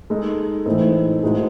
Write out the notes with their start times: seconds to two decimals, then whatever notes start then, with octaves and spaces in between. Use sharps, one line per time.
0.10 G#3 D#4 A4 D#5
0.66 A2 E3 A3 C4 D#4
1.23 A2 G#3 D#4 F#4 C5